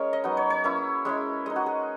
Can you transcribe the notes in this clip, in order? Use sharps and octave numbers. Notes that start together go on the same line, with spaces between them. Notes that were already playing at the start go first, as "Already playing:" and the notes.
Already playing: G#3 C#4 G#4 A#4 C#5
D#5
F#3 B3 D#4
C#5
C#5
A#3 C#4 E4
G#3 C#4 E4
G#3 D#4 D#5
F#4
G#4